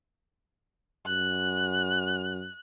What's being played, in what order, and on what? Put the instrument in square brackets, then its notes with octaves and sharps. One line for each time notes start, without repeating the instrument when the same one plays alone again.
[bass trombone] F#2 [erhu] F#6